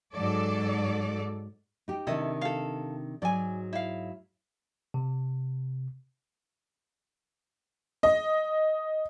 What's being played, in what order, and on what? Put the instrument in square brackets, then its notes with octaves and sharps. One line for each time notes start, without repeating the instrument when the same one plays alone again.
[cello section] G#2 F#3 A4 D5
[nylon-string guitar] D#4 G4
[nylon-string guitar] C3 D#3 D4 [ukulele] E4 A4 D#5
[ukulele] A4 F5
[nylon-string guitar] G#2 F#3 F#4 [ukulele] D5 G#5
[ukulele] E4 F5
[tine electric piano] C3
[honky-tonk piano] D#5